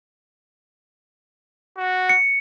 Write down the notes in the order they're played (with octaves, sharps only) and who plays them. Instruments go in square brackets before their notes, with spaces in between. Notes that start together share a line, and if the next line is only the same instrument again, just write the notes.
[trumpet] F#4
[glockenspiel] C#7